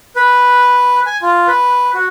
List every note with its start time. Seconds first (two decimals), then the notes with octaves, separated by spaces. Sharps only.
0.16 B4
1.06 G#5
1.22 F4
1.47 B4
1.94 F#4